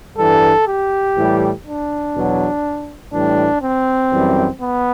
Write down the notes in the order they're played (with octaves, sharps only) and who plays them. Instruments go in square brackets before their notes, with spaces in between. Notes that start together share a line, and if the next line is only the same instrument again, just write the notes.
[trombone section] G2 E3 G3 A4
G4
A2 E3 G3
D4
E2 B2 F#3
A2 E3 G3 D4
C4
F#2 E3 G3
B3